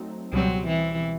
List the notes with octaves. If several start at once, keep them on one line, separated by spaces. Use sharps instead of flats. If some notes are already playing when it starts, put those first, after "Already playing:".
Already playing: F#3 A3 C4 D#4
C#2 B2 F#3 G3 C4
E3